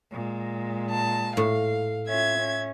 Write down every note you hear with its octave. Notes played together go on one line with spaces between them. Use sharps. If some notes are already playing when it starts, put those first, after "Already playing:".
A#2 G#3
A5
A2 F5
C#4 F4 E5 G#6
C#4